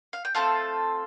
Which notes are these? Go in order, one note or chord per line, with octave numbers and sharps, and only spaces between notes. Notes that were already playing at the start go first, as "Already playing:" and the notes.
F5
G5
A3 C4 F4 A4 F5 A5